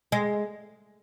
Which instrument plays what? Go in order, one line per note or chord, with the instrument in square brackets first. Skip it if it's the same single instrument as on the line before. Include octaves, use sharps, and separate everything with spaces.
[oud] G#3